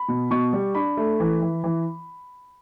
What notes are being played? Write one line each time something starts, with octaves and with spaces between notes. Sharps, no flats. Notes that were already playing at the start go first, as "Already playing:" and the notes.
Already playing: B5
B2
B2 C#6
G3
D4 B5
A3
E3
E3
E3